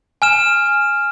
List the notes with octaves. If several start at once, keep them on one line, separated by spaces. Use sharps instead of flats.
G#5 F6 E7